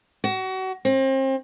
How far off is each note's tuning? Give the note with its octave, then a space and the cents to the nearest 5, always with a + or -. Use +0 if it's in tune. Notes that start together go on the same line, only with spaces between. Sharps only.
F#4 +30
C4 +35